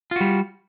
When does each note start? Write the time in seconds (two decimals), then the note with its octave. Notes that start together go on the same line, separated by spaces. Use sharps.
0.11 F4
0.16 F#4
0.21 G3